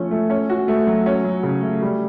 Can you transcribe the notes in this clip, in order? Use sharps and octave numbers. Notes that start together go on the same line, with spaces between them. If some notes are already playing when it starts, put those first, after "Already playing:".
Already playing: F3 A3 C#4
A3
C#4
F#4
A3
F#3
C#4
F#3
C#3
A3
G3